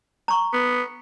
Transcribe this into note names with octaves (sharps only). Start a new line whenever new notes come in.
A#5 C#6
B3